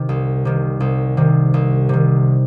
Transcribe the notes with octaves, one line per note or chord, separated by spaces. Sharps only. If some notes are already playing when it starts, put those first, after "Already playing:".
Already playing: C3 D#3
C2
C3 D#3
C2
C3 D#3
C2
C3 D#3